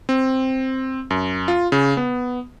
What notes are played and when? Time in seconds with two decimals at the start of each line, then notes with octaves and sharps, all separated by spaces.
0.09 C4
1.10 F#2
1.48 F4
1.72 C#3
1.97 B3